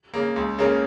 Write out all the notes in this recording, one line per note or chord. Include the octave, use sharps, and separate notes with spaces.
C#3 A#3
C#2
C#3 A#3 C#4 A#4